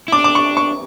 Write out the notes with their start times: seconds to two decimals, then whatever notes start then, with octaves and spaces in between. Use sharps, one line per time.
0.08 E4
0.12 D4 D6
0.24 D6
0.35 C#6
0.57 C#6